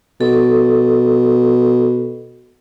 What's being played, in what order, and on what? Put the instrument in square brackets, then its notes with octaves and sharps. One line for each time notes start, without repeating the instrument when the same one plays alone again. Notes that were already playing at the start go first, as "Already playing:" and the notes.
[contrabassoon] B2 [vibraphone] A4